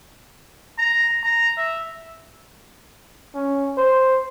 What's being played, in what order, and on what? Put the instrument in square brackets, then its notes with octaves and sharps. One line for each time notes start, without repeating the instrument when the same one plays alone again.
[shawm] A#5
A#5
E5
[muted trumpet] C#4
C5